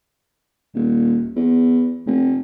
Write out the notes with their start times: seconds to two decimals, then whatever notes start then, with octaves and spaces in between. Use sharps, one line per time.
0.75 D#1
1.36 E2
2.07 F1